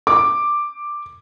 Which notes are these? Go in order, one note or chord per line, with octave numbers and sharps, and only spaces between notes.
D6